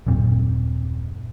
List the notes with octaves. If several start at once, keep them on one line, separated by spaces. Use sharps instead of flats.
D#1 F#2 A#2 C4